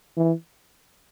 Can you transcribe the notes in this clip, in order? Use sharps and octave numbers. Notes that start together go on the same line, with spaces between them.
E3